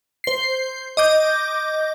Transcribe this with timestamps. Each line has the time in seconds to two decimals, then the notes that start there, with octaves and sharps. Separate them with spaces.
0.24 C5 C7
0.97 D#5 D6 G6